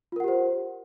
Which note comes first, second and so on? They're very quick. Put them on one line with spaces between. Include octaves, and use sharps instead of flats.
F4 A#4 F#5 G4 C5